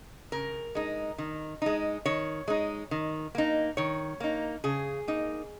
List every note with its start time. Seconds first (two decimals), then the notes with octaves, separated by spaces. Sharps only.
0.32 C#3 A#4
0.75 G#3 D#4
1.18 D#3
1.62 G#3 D#4
2.06 D#3 C#5
2.48 G#3 D#4
2.91 D#3
3.35 A#3 D#4
3.77 D#3 C#5
4.20 A#3 D#4
4.64 C#3 G#4
5.08 A#3 D#4